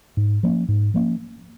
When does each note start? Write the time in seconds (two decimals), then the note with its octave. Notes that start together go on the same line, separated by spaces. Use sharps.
0.17 G#2
0.43 F3 A#3 C#4
0.69 G#2
0.94 F3 A#3 C#4